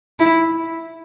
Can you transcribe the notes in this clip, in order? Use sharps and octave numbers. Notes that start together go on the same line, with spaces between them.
E4